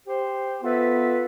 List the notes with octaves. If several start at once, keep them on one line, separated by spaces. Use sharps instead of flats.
G4 C5
B3 F4 A4 B4 E5